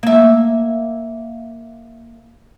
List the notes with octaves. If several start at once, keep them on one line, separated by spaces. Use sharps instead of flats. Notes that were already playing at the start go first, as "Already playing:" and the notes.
A#3 E5